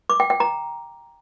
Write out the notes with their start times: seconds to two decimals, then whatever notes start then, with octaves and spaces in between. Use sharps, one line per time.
0.10 D6
0.20 G5
0.30 G5
0.40 A#5